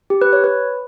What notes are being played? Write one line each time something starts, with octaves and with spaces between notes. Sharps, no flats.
G4
B4
C#5
B4